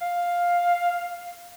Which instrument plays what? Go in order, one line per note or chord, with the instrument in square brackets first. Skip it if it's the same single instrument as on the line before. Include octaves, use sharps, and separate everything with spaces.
[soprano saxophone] F5